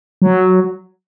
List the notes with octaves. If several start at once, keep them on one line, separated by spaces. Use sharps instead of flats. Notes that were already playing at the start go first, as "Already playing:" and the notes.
F#3